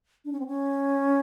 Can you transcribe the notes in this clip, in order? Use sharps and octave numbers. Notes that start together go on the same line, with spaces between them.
D4
C#4
C4
C#4